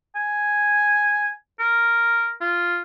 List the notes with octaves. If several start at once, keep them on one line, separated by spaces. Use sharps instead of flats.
G#5
A#4
F4